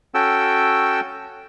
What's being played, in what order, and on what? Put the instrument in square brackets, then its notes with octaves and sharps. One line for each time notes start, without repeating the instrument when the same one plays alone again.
[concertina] C#4 F#4 A4 G5 E6